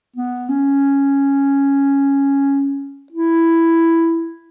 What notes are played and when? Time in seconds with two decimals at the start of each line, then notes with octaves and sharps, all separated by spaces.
0.16 B3
0.49 C#4
3.12 E4